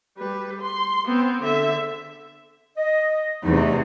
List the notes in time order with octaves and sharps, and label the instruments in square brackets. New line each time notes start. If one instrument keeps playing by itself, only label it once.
[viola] G3 B4
C6
B3 C4
D3 E5
[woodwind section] D#5
[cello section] E2 C3 [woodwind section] A3 D#4